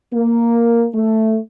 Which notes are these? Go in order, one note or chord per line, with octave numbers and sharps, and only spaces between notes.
A#3
A3